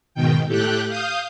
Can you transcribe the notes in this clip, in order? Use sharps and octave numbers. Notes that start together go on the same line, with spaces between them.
G#2 B2 D#3 G5
A2 A3 G4 G5 F#6
F5 D#6 G6